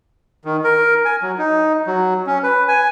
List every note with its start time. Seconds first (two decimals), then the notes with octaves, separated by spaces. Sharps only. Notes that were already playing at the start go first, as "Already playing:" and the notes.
0.45 D#3
0.64 A#4
1.05 G#5
1.22 F#3
1.38 D#4
1.87 F#3
2.27 C#4
2.43 B4
2.68 G#5